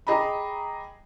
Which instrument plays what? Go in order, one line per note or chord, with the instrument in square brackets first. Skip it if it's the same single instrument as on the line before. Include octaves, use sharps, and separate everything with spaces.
[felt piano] G4 G#4 D#5 A#5 B5